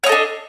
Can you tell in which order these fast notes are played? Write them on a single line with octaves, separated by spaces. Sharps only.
C#5 D#5 A4 D4